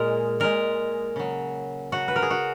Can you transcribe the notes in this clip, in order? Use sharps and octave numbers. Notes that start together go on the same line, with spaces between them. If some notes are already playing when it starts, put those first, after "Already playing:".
Already playing: A#2 G#3 A#4
A#2 G#3 A#4
C#3 F#3
C#3 F#3 F#4
B4
A#4
G#4
F#4